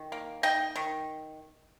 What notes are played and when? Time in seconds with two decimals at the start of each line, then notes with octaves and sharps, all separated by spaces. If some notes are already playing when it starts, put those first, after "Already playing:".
Already playing: D#3
0.12 A#3
0.43 D#4 D#5 G5
0.76 D#3